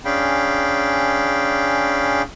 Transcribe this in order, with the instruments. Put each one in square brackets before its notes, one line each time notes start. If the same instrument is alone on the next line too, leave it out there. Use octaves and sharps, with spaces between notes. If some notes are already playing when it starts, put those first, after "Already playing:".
[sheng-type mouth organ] C#4 D4 G#4 F5 G5 B5